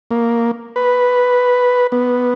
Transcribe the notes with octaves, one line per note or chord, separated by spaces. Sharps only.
A#3
B4
B3